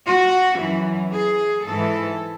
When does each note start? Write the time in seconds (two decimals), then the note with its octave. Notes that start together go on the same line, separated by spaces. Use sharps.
0.08 F#4
0.60 F#2 E3
1.13 G#4
1.65 G#2 E3 A4